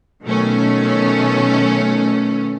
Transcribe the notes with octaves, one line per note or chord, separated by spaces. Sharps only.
B2 D#3 F#3 A3 C#4